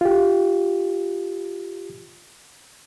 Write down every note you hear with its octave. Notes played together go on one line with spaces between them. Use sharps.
F4 G4